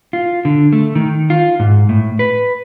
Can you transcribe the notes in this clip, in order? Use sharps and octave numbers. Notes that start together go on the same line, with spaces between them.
F4
D3
A3
D#3
F4
G#2
A2
B4